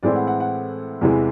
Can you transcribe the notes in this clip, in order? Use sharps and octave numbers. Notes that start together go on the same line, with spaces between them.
A2 E3 G#3 C4 E4 D5
F#5
F#5
F#5
E2 C3 E3 G#3